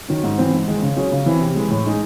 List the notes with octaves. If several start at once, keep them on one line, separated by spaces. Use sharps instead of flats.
D#3 F#3 C#4
G#2
E3 C4
G#2
D#3 G#3 D#4
C#3
F#3 C#4 G#4
C#3
E3 C4 E4
C3
E3 G#3
A2
G#3 D#4 G#4